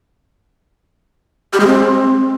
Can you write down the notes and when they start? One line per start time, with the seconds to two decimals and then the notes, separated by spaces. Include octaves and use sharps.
1.53 G4
1.60 G#3
1.67 C4